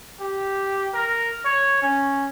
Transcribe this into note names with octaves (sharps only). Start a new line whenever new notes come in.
G4
A#4
C#5
C#4